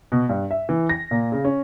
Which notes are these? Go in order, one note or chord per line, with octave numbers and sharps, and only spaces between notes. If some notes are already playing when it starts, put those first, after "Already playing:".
B2
G2
E5
E3
A#6
A#2
C#3
C#4